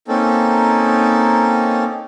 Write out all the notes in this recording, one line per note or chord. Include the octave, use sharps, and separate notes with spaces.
A#3 C4 C#4 D#4 A4